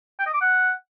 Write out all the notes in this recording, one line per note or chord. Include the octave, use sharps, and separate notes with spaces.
G5
D#5
D6
F#5